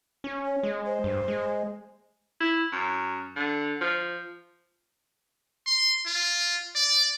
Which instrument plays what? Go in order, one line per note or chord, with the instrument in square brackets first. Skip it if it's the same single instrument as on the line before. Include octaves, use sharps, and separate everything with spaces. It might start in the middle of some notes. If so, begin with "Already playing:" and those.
[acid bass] C#4
[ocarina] C#5
[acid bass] G#3
[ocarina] C5
[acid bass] G2
G#3
[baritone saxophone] E4
F#2
D3
F3
[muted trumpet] C6
F4
D5